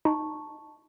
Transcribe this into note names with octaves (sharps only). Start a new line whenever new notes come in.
D#4 A5 C#6